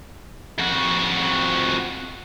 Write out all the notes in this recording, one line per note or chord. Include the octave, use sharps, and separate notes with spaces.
F2 F#4